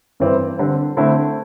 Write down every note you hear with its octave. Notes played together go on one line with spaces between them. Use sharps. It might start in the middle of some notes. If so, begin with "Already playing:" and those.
G2 E3 C4 E4
D3 G3 C4
D3 A3 C4 E4